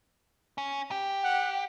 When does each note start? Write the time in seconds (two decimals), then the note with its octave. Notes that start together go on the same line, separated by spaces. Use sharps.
0.58 C#4
0.91 G4
1.23 F#5